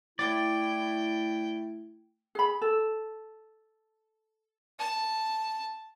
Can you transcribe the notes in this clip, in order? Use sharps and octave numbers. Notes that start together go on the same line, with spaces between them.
A3 E4 D5 G5
G#4 B5
A4
A5